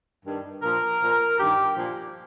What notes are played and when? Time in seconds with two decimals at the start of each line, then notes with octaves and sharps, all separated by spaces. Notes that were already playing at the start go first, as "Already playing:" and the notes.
0.25 G2 D#3
0.62 A#2 F3 A#4
1.01 A#2 F3
1.39 G2 D#3 G4
1.76 A#2 F3